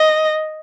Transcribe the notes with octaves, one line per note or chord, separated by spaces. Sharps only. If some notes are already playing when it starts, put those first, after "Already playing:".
Already playing: D#5